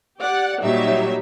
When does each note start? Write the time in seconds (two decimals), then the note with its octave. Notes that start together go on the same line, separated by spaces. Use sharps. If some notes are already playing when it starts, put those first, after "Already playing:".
0.20 G4 D5 F#5
0.61 A#2 F#3 G3 D#4 E5